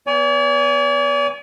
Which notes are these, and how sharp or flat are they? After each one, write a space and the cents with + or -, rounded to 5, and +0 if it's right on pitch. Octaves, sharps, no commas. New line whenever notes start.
B3 +0 D5 -45 G#5 -5